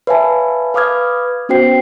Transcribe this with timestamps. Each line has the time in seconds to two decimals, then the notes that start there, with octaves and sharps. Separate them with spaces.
0.07 B4 C#5 E5 F5 G#5 A5
0.74 B4 F5 D6 D#6 F6 G#6
1.49 B3 C#4 F#4 C5 G5 C7